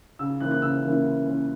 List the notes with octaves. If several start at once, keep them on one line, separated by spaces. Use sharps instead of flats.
C#3 E6
E3 A#3 C#4 F#6
F#6
C#3 E6
E3 A#3 C#4
C#3
E3 A#3 C#4